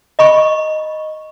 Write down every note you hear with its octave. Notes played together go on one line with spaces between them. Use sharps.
D#5 B5 C#6